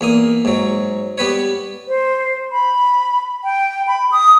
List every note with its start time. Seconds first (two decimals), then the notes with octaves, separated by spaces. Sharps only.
0.01 E2 A#3 D#6
0.45 G#2 F#3
1.18 G3 B3 B4 C#5
1.88 C5
2.52 B5
3.44 G5
3.87 B5
4.12 D#6